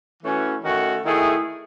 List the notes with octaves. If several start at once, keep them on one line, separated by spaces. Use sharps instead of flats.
E3 A3 C#4 F#4
D#3 A3 C#4 F#4
D#3 A3 E4 G#4